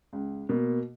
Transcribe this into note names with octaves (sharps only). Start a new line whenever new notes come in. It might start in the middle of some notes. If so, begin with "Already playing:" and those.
C#2
B2 A#3